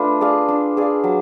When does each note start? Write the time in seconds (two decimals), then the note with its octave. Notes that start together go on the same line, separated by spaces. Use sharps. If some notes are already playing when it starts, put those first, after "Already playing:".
Already playing: A3 D4 F4 B4
0.21 G#4 D5 F5
0.48 D4
0.77 G#4 D5 F5
1.04 F#3